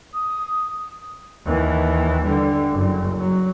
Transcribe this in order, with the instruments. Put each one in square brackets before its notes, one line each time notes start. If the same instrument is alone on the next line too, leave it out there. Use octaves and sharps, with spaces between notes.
[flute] D#6
[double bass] D#2 E3
D3 G3
F#1
F#3